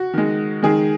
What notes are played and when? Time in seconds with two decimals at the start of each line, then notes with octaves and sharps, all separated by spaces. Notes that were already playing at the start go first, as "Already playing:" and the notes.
Already playing: F#4
0.14 D#3 G#3
0.63 D#3 G#3 G#4